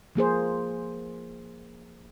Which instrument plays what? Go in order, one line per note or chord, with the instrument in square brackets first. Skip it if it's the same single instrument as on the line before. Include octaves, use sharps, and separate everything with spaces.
[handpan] F3 A#3 G#4 C5